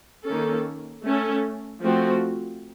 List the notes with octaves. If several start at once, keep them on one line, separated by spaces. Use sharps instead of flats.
D#3 A#3 C#4 A4
A3 C#4 A4
F3 A3 C4 F#4